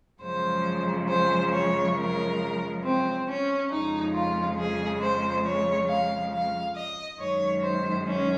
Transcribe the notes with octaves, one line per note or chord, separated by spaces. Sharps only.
F#2 C#3 F3 G#3 C5
C5
C#5
A#4
C4
C#4
F2 C#3 F3 G#3 D#4
F4
G#4
C5
C#5
F5
F5
D#5
F#2 D#3 G#3 C#5
C5
C#4